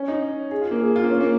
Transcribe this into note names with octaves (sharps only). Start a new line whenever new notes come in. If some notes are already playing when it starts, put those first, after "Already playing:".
Already playing: C#4
D#4
G#4
F4
A#3
G#4
F4
A#3
C#4
A#3